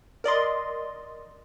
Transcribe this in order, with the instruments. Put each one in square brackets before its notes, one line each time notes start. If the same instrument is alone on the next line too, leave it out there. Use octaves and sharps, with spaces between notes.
[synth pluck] A#4 D5 D#5 C6